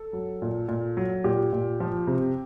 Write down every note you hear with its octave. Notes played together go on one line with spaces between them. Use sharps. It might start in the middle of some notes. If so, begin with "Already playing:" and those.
Already playing: A4
F#3
A#2
A#2
F#3
A#2 G4
A#2
F3
C3